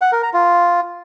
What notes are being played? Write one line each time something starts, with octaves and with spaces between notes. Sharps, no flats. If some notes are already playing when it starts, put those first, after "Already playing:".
F#5
A#4
A#5
F4